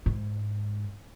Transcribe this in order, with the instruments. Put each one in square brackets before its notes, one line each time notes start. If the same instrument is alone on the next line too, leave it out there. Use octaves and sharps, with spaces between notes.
[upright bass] G#2